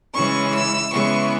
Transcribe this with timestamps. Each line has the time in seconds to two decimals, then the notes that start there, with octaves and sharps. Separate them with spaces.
0.14 C#3 E3 G#3 C#4 E4 C#6
0.54 E6
0.92 C#3 E3 G#3 B3 E4 C#6